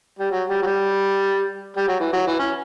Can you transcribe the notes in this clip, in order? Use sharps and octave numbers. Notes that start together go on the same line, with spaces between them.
G3
F#3
G3
F#3
G3
G3
F#3
E3
F#3
E3
C#4